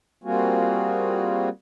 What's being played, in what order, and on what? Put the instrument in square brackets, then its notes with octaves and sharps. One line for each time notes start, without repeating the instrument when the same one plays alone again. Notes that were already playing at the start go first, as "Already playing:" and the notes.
[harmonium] G3 A#3 C4 F4 F#4 G#4